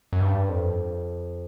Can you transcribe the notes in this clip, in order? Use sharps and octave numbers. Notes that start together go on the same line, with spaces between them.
F#2
G2
F2